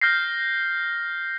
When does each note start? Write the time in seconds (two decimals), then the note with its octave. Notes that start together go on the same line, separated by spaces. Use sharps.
0.01 F6 G6 A#6 C7